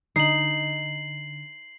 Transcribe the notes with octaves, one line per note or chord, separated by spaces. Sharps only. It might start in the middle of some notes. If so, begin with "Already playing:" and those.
D3 D#4 C7 F#7